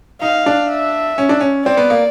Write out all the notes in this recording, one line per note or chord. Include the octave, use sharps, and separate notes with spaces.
D#4 F5
D4
E5
C#4
D4
C#4
C4 D5
B3
A#3